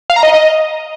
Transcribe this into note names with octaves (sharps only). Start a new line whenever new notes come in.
F5
A#5
D#5